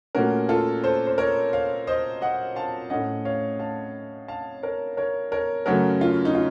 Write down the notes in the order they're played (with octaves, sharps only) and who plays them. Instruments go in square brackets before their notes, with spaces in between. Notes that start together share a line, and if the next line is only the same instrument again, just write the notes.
[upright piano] A#2 A3 C#4 F#4 A#4
F4 A4
A4 C5
C5
A#4 C#5
C#5 F5
C5 D#5
D#5 F#5
F5 A5
A2 A3 C#4 D#5 F#5
C#5 F5
F5 A5
F5 A5
A#4 C#5
A#4 C#5
A#4 C#5
F#2 C#3 A3 C#4 F#4 A#4
F4
D#4
F4